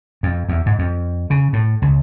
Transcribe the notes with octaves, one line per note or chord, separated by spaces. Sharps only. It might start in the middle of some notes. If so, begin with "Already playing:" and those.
F2
E2
G#2
F2
C#3
A2
C#2